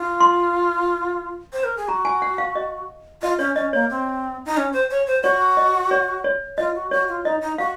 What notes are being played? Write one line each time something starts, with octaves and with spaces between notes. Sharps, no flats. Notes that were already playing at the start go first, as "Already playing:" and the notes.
Already playing: F4
C6
C5
A#4
G#4
F#4 A#5
G#5
F#5
F5
D#5
F4 D#5
C#4 C#5
C#4 D#5
A#3 C#5
C4
D#4
C#4
C5
C#5
C5
F#4 C#5
D#5
C#5
C#5
F4 D#5
F#4
F#4 C#5
F4
D#4 D#5
D#4
F#4 F5